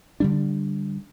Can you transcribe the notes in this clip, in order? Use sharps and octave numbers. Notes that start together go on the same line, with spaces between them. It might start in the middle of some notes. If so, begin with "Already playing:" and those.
D3 G3 D4